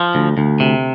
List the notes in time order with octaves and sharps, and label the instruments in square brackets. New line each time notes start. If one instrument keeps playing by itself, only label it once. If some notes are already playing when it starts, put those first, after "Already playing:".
Already playing: [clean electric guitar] F3
D2
D2
C3